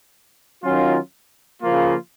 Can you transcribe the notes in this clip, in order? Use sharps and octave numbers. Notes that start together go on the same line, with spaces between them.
D#3 F#3 C#4 F4
C#3 F3 A#3 F4